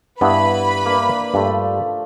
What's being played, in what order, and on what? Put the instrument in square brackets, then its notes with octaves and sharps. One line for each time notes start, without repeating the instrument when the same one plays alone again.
[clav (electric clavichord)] G2 B3 E5 [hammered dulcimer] E3 [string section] B4 B5
[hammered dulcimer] A#3 D4
[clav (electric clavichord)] G2 [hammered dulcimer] F3 A3